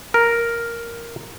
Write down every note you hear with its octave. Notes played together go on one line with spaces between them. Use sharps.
A#4